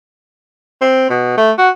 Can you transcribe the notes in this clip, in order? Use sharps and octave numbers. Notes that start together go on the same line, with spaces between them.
C4
B2
A3
F#4